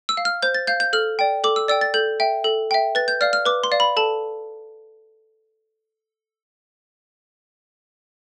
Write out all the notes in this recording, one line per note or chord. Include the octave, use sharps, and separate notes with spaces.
E6
F5
F6
C5 G6
A6
F5 G6
G6
A4 F6
D5 G5
A4 D6
E6
D5 G5 E6
A6
A4 G6
E5 G5
A4
E5 G5
B4 A6
G6
D5 F5 F6
F6
B4 D6
C6
D5 F5
B5
A4 A5